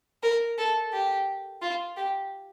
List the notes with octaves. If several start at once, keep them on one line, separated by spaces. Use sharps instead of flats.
A#4
A4
G4
F4
G4